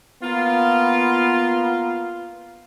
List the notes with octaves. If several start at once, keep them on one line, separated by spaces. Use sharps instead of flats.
A#3 B3 F4